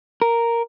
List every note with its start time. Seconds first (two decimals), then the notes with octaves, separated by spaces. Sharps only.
0.22 A#4